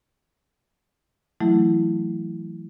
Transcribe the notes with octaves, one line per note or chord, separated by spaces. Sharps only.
E3 F#3 A3 E4